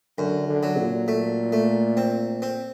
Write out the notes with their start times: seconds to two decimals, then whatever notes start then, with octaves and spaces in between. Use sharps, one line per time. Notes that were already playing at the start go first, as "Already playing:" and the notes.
0.18 F#2 D3
0.49 D3
0.63 F#3
0.78 A#2
1.08 A3
1.52 A3
1.97 C4
2.42 C4